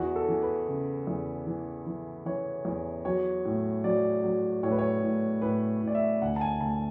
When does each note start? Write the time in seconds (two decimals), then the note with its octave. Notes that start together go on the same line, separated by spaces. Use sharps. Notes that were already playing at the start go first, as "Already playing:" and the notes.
Already playing: E2 F#4
0.16 A4
0.28 E3
0.42 B4
0.68 C#3
1.07 E2
1.47 E3
1.86 E3
2.26 E3 C#5
2.65 E2
3.05 F#3 C#5
3.45 A2
3.84 F#3 D5
4.24 F#3
4.63 A2 C#5
4.71 B4
4.78 C#5
5.03 A2
5.42 A2 B4
5.82 A2
5.87 D5
5.95 E5
6.22 D2 F#5
6.36 A5
6.41 G#5
6.61 D2 A5